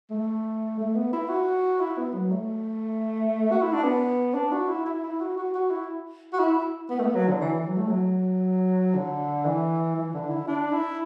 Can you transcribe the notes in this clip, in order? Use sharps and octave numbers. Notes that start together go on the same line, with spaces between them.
A3
A3
B3
E4
F#4
E4
B3
F#3
A3
F#4
E4
D4
B3
D4
F#4
E4
E4
E4
F#4
F#4
F#4
E4
F#4
E4
B3
A3
B3
F#3
D3
E3
F#3
A3
F#3
D3
E3
E3
D3
E4
D4
E4